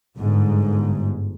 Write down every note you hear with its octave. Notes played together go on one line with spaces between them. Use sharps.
G1 G#2